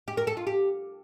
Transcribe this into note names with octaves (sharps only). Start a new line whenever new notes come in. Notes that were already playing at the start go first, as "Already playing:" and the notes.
G4
A#4
A4
F4
G4